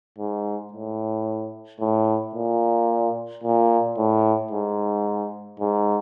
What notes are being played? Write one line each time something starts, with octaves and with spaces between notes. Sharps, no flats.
G#2
A2
A2
A#2
A#2
A2
G#2
G#2